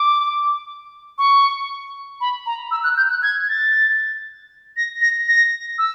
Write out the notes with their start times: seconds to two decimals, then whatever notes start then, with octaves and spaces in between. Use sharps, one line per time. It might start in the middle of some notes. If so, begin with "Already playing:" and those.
Already playing: D6
1.18 C#6
2.21 B5
2.46 A#5
2.71 E6
2.84 F#6
2.97 G6
3.10 F#6
3.23 G#6
3.49 A6
4.77 A#6
5.01 A#6
5.28 A#6
5.78 E6